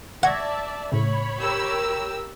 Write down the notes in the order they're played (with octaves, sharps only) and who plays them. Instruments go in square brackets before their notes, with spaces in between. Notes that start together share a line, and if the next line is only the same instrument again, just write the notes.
[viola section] D5 E5 A5 [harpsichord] F#5 [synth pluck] C#6 G#6 A#6
[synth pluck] A2 C#3 [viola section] C#5 B5
[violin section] G4 A#4 E6